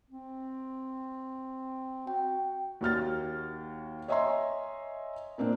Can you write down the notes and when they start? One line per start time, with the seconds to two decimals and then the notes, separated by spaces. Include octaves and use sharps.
0.10 C4
2.07 F#4 G5
2.81 D#2 F#4 F6 A6
4.08 C#5 D#5 E5 G#5 A#5 C6
5.38 A#2 A#3 C4 D4